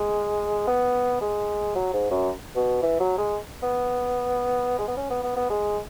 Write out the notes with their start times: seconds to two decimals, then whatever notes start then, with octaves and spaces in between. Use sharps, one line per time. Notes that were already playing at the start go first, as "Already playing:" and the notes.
Already playing: G#3
0.67 B3
1.21 G#3
1.75 F#3
1.93 G#2
2.11 F#2
2.56 B2
2.82 E3
3.00 F#3
3.18 G#3
3.63 B3
4.79 G#3
4.88 B3
4.97 C#4
5.10 B3
5.23 B3
5.36 B3
5.50 G#3